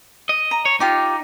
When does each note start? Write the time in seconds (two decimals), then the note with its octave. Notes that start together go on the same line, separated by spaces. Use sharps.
0.29 D#5
0.51 A#5
0.65 C#5
0.80 D#4 F4 G4 D6